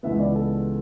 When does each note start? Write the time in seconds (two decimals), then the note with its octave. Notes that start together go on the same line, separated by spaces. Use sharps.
0.03 C#2 C#3 E3 B3 E5
0.19 D5
0.35 A4